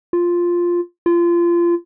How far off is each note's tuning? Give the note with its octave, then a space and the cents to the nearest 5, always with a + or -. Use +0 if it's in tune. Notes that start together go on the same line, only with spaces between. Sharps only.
F4 +0
F4 -25